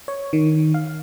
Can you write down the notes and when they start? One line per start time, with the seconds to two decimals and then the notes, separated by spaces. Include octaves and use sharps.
0.08 C#5
0.33 D#3
0.74 F5